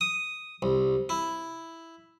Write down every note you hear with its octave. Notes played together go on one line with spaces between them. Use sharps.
D#6
C2
E4